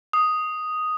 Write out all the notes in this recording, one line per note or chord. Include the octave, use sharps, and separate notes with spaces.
D#6